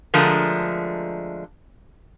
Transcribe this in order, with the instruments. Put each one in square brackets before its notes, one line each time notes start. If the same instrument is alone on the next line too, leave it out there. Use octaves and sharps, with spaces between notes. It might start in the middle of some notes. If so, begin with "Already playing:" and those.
[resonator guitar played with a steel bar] D3 F3 G#3 A3 A#4